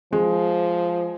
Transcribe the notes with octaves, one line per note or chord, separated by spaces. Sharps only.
F3 G#3